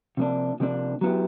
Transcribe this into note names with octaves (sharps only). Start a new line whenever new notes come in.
C3 F3 A#3 D4
C3 F3 A#3 D4
F#3 B3 E4 G4